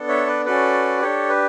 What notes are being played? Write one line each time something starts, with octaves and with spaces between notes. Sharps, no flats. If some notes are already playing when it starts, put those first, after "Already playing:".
Already playing: B3 D4 A4
C#5 E5
B4 D5
C#4 F#4 A4 B4 D5
D4 G4 A4 C#5
B4